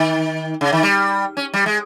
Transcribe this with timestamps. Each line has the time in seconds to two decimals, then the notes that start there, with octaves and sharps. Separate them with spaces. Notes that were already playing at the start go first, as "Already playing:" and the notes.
Already playing: D#3
0.61 C#3
0.73 D#3
0.83 G3
1.37 C#4
1.54 G3
1.66 G#3